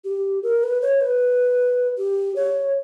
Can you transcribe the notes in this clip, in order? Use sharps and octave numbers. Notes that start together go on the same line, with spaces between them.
G4
A#4
B4
C#5
B4
G4
C#5